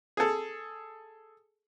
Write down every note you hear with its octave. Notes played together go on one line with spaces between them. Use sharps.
G#4 A4